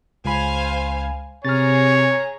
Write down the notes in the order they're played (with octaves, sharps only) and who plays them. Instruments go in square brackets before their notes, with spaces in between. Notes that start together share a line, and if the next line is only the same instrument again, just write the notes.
[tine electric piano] C#2 B5 [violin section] C5 F5 G#5
[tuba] C3 [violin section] G#4 A#5 [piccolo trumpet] C#5 [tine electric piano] F6 A6